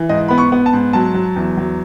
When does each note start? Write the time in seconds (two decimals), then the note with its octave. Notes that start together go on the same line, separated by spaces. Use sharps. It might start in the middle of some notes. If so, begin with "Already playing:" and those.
Already playing: E3
0.09 G#2 D#5
0.28 B3 B5
0.38 C#6
0.52 B3
0.66 A5
0.73 G#2
0.93 F#3 A5
1.14 F#3
1.36 E2
1.57 F#3